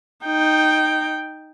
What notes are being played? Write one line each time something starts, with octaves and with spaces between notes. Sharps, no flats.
D#4 G5